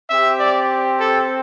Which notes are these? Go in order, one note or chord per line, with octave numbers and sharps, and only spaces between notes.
C4 G4 E5
D5
A4